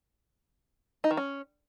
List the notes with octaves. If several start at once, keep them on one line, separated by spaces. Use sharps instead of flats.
D#4
D#3
C#4